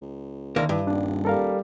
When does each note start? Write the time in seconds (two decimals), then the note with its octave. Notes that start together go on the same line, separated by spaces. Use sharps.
0.02 C#2
0.56 D2 D#3 A#3
0.69 G2 E3
0.87 D#1 D4
1.25 G3 A4 A#4 F5